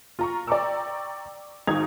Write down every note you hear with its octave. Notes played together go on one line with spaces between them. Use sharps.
F4 A#5 C#6
D5 G5 A#5 C#6 D6 E6
G#1 G#2 D#4 D#6 G#6 F7